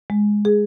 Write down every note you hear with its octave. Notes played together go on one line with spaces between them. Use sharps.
G#3
G#4